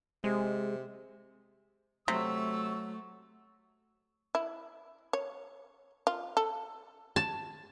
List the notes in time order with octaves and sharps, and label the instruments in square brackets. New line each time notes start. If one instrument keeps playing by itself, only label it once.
[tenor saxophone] C3 [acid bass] G#3
[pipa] C3 [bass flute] F#3 [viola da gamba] A3 [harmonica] E6
[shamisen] E4
C#5
F4
A4
[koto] A5